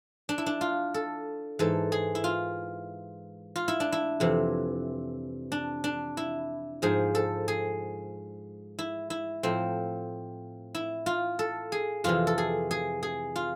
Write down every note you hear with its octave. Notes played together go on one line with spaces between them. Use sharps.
D4
E4
D4
F4
A4
G#2 E3 A4
G#4
E4
F4
F4
E4
D4
E4
F2 C3 E3
D4
D4
E4
G#2 F3 G#4
A4
G#4
E4
E4
A2 F3 C4
E4
F4
A4
G#4
F2 C3 E3 F4
A4
G#4
G#4
G#4
F4